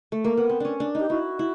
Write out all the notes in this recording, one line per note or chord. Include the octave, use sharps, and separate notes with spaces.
A3
A#3
B3
C4
C#4 D4
D4
D#4 G4
E4 F#4
E4